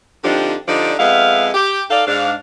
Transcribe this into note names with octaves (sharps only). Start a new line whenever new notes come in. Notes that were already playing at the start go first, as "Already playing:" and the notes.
D3 F3 C4 D4 D#4 G4
D3 F3 D#4 G4 D5
F2 G#3 B3 E5 F5
G4
D#4 A4 D5 F5
G#2 D4 F5